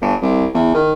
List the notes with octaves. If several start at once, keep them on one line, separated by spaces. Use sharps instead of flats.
G1
C2
E2
D#3